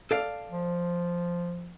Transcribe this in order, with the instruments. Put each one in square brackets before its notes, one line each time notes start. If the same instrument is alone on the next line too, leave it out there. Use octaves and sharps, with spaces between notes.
[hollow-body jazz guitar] A4 D5 F5
[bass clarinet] F3